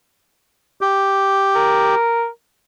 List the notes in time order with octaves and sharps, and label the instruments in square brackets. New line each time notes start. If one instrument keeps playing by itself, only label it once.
[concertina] G4
[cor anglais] A#4